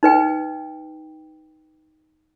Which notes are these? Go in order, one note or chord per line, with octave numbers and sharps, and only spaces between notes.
D#4 B4 G5